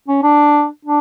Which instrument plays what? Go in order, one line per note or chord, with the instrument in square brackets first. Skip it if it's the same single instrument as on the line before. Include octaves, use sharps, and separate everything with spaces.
[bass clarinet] C#4
D4
D4